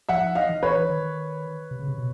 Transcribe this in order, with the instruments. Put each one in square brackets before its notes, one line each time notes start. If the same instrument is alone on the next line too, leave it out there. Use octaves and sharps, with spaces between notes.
[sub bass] F3 [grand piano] E5 F#5
[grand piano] D#5 F5
[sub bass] E3
[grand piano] B4 C#5
[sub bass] D#3
C3
C#3
C3
B2